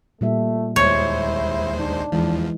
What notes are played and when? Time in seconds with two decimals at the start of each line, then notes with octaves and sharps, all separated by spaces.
0.21 A#2 G3 A3 E5
0.76 D#2 G#3 E4 C5 C#5
1.79 D4 D#4
2.12 E2 E3 F3 G#3